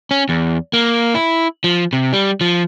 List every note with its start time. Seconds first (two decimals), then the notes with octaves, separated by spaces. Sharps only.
0.11 C#4
0.29 E2
0.73 A#3
1.14 E4
1.64 F3
1.93 C3
2.13 G3
2.41 F3